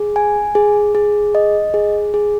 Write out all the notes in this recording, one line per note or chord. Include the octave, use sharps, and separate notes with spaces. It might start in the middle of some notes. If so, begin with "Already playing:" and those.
Already playing: G#4
G#5
G#4
G#4
D#5
G#4
G#4